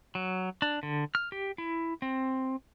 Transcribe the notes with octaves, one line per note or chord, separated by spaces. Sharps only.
F#3
D4
D3
F6
G4
E4
C4